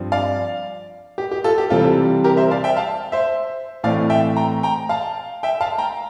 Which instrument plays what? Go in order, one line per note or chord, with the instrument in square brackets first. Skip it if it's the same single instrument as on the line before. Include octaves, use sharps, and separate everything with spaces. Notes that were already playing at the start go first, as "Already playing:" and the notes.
Already playing: [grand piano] G2 F3 C4
D5 F5
G4
G4
F4 A4
G4
C3 E3 G3 C4 F4 A4
G4 A#4
C5 E5
D5 F5
E5 G5
F5 A5
C5 E5
A2 E3 A3 C4 D5 F5
E5 G5
G5 A#5
G5 A#5
F5 A5
E5 G5
F5 A5
G5 A#5